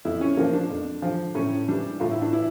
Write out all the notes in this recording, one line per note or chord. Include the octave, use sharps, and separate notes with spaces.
F2 E4
C#4
D3 F3 A#3
D4
F2
D3 F3
A2 C#4
E3 G3 D4
A2 F4
E4
D4
E3 E4